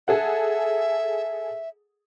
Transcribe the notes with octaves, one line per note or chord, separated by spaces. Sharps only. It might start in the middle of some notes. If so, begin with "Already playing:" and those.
G#4 A4 E5 F#5